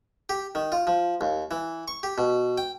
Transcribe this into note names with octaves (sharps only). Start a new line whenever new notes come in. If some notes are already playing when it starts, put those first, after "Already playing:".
G4
D#3
F4
F3
D#2
E3
C#6
G4
B2
G5